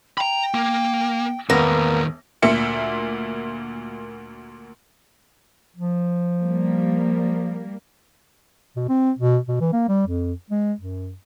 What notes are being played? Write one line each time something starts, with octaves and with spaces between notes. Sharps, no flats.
G5 A#5 B5
A#3
E1 A2 D#3 A#3 B3 A#6
D2 A#2 A#3 E5 C#7
F3
G3 A#3
B2
C4
B2
B2
E3
A#3
G3
F2
G#3
F#2